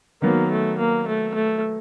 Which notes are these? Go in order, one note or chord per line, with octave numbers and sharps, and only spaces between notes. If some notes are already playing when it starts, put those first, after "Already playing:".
D#3 F#3 A#3 B3
A3
A#3
A3
A3